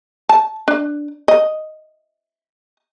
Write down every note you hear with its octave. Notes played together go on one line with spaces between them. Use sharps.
A5
D4
D#5